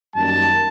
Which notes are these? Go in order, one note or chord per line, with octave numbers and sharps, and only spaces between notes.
F#2 D#3 G3 A#3 A5